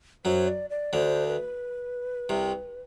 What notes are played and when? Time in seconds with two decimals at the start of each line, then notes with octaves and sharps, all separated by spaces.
0.25 F#2 F#3 C5
0.48 D5
0.70 D5
0.93 D2 D3 C5
1.27 B4
2.29 C2 C3